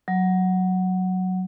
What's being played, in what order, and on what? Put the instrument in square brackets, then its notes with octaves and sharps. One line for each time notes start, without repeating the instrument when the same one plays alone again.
[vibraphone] F#3